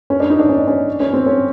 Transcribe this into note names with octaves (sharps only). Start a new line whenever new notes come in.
C#4
D4
D#4
D4
C#4
C#4
C#4
C4
C#4